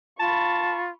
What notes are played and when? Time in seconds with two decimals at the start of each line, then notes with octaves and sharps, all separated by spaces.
0.20 F4 A5 B5 C#6